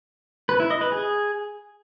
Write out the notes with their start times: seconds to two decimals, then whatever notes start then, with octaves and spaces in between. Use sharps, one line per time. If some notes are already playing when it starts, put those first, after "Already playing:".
0.49 B4
0.60 E4
0.70 D#5
0.81 B4
0.92 G#4